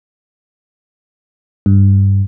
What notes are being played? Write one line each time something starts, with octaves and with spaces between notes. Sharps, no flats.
G2